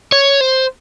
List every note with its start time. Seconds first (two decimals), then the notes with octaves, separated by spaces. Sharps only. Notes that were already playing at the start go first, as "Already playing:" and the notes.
0.12 C#5
0.41 C5